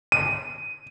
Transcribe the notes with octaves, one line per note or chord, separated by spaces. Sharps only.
D#7